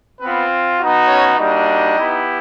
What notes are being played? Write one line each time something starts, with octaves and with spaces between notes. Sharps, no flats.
B3 C4 F4 B4
B3 D#4 F#4
C#4 C#5
G3 A#3 D4 D#4 F#4 D#5
B3 E4 G4